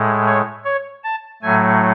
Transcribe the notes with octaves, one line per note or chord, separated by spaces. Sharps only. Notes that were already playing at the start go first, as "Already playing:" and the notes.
Already playing: A2 G#3
C#5
C#5
A5
A2 F#3 A3 G#5